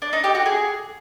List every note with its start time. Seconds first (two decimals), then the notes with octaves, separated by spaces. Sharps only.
0.02 D4
0.13 D#4
0.24 G4
0.35 F#4
0.46 G#4